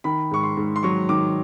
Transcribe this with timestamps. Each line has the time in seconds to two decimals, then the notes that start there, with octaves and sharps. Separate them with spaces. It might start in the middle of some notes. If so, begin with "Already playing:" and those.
0.04 D#3 B5
0.31 G#2 C#6
0.43 C6
0.57 G#2
0.76 C6
0.83 F#3 C#6
1.09 D#3 D6